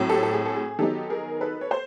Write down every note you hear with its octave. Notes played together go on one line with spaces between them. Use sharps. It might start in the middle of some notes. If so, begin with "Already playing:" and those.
Already playing: A2 F#3 A3 C4
G4 A4
A4
G#4
A4
G#4
D#3 F#3 B3 D#4 G4 A4
G#4 A#4
A4 B4
C#5
C5